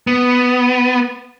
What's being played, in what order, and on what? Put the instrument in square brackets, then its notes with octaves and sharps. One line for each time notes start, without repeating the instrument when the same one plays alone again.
[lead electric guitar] B3